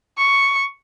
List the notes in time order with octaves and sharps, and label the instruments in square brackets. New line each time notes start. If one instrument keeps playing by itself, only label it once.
[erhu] C#6